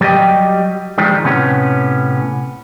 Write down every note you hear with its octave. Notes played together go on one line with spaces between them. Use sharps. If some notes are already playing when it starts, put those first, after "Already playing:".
F#3 G3 G4 D#5 G5
D#3 F3 G3 G#3
A2 C3 B3 C#4